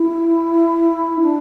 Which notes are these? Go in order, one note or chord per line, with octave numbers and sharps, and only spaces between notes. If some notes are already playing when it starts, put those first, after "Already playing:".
Already playing: E4
D4